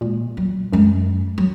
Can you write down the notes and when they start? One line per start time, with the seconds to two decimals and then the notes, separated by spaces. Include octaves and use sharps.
0.01 A#2 G#3
0.37 F#3
0.73 F#2 G#3
1.38 F#3